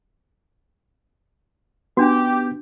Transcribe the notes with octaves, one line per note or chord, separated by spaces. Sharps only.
B3 C#4 D4 F#4 G4